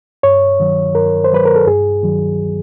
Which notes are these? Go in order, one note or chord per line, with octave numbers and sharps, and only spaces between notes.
G2 C#5
D#3 F#3
G2 A#4
C5
D#3 F#3 B4
A#4
A4
G2 G#4
D#3 F#3